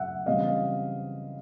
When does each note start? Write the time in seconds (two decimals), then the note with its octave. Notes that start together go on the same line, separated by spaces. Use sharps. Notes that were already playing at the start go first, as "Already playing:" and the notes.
Already playing: F#2 C#3 E5 F#5
0.26 C#3 E3 G3 C4 D#5 F5